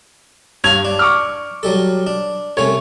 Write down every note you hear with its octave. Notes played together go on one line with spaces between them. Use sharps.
G2 C#5 F5 G#6 F7
D4
C#6 D6 F6
F#3 G3 A4
D4
C2 A3 C#4 C#5